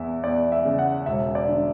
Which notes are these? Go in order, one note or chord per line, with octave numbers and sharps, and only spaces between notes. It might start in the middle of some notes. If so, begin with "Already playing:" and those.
Already playing: E2 E3 E5
E2 D5
E5
C#3
F#5
E1 E5
D5
D3